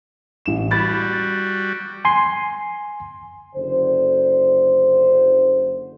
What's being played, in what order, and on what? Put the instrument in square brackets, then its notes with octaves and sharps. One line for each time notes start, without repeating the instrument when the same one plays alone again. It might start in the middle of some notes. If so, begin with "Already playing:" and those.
[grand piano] A1 E7
[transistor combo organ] G3 F#4 [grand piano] B5 A6
[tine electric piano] G#5 C6
[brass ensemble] F#1 D3 C5